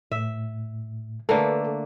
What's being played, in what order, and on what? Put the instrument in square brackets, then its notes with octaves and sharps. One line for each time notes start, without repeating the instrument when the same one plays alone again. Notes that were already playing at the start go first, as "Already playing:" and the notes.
[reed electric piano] A2 [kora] E5
[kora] D3 A3 A#3 [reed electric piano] A4 B4